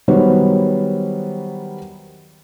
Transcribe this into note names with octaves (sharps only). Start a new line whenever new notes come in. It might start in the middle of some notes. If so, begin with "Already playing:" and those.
D#3 F#3 G3 B3 C5 C#5